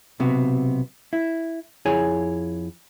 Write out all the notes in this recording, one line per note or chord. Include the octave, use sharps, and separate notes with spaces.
B1 C3 B3 F#4
E4
F2 E4 G#4 C#5 G#5